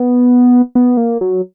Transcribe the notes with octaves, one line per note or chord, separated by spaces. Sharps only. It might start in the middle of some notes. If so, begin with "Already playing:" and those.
Already playing: B3
B3
A#3
F#3